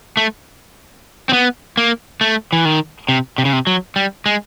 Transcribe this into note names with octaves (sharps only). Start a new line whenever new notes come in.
A3
C4
B3
A#3
A3
E3
D#3
C3
C3
C#3
C3
F#3
G3
G#3